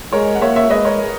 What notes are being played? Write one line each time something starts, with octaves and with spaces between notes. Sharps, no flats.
G#3 A#4 C#5
F#5
A#3 C#5 E5
C#5 E5
G#3 B4 D#5
A#4 C#5